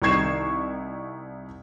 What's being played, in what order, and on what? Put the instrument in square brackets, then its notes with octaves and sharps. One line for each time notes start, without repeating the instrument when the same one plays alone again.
[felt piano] C2 D#3 C#6 G#6 C7 E7